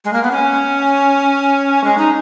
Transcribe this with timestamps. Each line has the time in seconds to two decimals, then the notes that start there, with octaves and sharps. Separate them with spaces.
0.04 G#3
0.13 A#3
0.23 B3
0.31 C#4
1.84 G#3
1.98 D#4